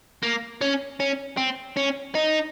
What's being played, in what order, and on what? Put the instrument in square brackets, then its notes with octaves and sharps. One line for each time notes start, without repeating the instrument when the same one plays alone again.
[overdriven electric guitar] A#3
C#4
C#4
C4
C#4
D#4